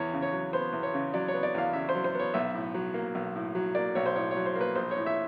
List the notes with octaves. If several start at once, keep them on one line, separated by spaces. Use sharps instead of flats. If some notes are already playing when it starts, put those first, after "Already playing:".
Already playing: E2 C#5
C#3
C#5
F#3
B3 C5
E2
C#5
C#3
F#3 D5
C#5
B3
D5
E2 F5
C#3 E5
C5
F#3
C5
B3 C#5
B1 E5
A2
F#3
A#3
B1
A2
F#3
A#3 D5
B1 C#5
C5
A2 C#5
C#5
F#3
C5
A#3
B4
A#1 C5
C#5
A2
E5